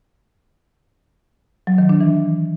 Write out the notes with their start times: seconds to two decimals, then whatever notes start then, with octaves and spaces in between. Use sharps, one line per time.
1.67 F#3
1.78 D#3
1.89 D4
2.01 E3